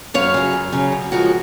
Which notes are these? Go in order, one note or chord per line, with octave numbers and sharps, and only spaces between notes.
F#2 C#5 F5
C#3 F#3
F#2
C#3 F#3
F#2
C#3 F3 G#3 F#4 A#4